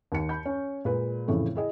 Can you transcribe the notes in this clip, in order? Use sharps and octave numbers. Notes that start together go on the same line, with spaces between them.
D#2 C#7
B5 G6
C#4
A#2 G#3 B4
F2 A2 C#3 E3 A3
E4 G#4 D#5